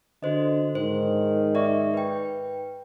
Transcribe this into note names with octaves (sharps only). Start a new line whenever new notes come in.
D3 F#4 C5 D#5
G#2 D#3 C5
D5 E5 C#6
B4 G5